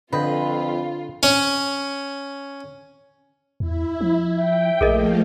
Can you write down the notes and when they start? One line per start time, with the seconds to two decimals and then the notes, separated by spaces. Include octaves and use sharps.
0.13 F2 D3 F4 B4 D#5 G5
1.23 C#4 C#5
3.60 E2 E4
4.01 F3
4.36 E5 G5
4.81 A#1 F3 A3 A#3 G#4 A#4 D#5